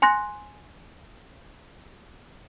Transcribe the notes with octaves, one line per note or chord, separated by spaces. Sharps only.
G#5 C6 F#6 A#6